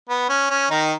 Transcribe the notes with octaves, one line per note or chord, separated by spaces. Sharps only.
B3
C#4
C#4
D#3 D#4